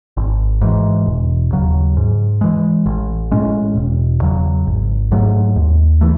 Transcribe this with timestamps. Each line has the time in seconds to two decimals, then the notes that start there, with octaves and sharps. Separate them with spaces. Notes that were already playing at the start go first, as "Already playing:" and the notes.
0.17 G#1
0.61 G#2 E3
1.06 E1
1.52 D#2 C#3 F#3
1.97 G#2
2.41 E3 G#3
2.86 A1
3.31 A2 G#3 C#4
3.76 E1
4.21 E2 C#3 F#3
4.67 G#1
5.12 G#2 F#3 A3
5.56 D#2
6.01 E3 A3